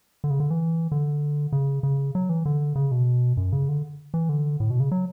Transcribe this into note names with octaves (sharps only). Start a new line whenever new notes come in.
D3
C#3
D3
E3
D3
C#3
C#3
F#3
E3
D3
C#3
B2
F#2
C#3
D3
E3
D3
A2
B2
C#3
F#3